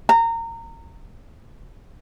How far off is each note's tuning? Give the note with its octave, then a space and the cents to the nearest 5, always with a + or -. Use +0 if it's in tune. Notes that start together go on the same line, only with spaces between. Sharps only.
A#5 -25